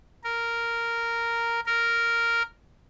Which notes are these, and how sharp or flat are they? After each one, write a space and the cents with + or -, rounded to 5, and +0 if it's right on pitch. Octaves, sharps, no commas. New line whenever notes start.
A#4 -5
A#4 -5